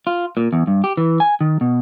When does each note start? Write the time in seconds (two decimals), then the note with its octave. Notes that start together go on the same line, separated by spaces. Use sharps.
0.07 F4
0.37 A#2
0.53 E2
0.67 G2
0.84 G4
0.97 E3
1.20 G#5
1.41 D#3
1.61 B2